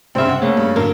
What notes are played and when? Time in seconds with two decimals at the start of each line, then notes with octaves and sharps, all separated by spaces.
0.15 C2 G2 C#3 C4 E5
0.29 F#5
0.42 C#3 A3 A#3
0.57 G2
0.76 F#2 A2 D3 F#3 A#3 A#4